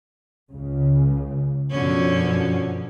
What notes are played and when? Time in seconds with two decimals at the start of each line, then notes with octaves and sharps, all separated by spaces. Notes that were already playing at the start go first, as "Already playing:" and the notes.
0.52 C#2 C#3
1.71 F#2 B2 D3 F3 C#4